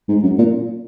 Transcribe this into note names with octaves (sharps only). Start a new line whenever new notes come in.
G#2
F#2
A#2